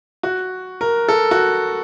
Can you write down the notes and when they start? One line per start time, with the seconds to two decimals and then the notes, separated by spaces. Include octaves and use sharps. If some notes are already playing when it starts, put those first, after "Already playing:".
0.23 F#4
0.81 A#4
1.09 A4
1.31 F#4